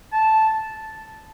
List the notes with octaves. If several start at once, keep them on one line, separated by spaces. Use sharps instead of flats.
A5